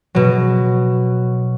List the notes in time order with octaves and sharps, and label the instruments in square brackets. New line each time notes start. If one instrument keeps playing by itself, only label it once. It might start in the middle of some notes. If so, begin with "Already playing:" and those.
[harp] B2 F#3